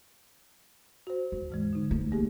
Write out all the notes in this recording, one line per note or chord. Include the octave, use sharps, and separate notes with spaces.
F#4 C5
D#2
G#2 E3 G#3
D3 D#4
A3
A#3 G4 G#4